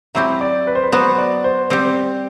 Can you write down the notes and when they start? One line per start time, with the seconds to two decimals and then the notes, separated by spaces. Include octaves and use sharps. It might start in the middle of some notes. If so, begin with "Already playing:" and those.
0.15 F#3 C4 E4 G4 E5
0.41 D5
0.67 B4
0.75 C5
0.83 B4
0.92 F#3 B3 F#4 C5
1.18 D5
1.44 C5
1.70 G3 C4 G4 C5